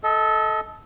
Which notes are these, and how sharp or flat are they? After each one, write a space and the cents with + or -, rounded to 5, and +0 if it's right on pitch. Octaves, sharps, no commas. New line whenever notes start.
A4 -10 D#5 +25